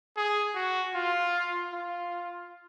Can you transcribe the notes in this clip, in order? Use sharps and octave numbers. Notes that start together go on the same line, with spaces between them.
G#4
F#4
F4
F4